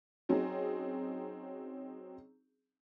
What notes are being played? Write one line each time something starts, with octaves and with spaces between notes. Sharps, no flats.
F#3 C4 C#4 D#4 G#4